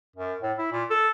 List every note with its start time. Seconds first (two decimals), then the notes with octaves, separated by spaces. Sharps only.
0.16 F#2
0.42 A2
0.58 E4
0.72 A#2
0.90 A4